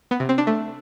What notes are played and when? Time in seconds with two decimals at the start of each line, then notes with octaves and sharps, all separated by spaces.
0.11 B3
0.20 C3
0.29 C4
0.38 D4
0.47 A3